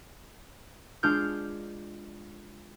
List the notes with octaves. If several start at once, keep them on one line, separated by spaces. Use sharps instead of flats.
G#3 D4 F4 F6 G6